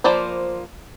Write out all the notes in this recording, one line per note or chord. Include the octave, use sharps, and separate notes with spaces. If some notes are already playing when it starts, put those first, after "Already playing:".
F3 A#3 C5 D5 B5